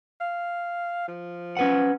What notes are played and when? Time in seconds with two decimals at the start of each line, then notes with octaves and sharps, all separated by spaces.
0.21 F5
1.08 F3
1.57 C#4 B4 F#5